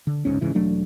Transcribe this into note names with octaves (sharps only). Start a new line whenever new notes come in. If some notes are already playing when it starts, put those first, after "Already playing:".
D3
G1 C#2 G#2 C#4
G#2 C#3 E3
E1 F#3 A3 D4